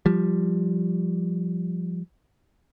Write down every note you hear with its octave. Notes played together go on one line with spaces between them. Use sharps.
F3 G3